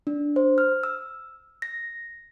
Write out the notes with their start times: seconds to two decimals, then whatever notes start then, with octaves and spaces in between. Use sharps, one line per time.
0.07 D4
0.36 C5
0.58 F6
0.83 E6
1.62 A#6